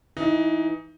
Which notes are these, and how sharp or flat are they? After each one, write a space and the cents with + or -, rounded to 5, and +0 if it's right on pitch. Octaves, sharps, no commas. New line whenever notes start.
E3 +0 D#4 +15